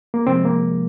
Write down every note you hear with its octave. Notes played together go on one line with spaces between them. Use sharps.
A#3
C3 F3 G#3 C4
A#3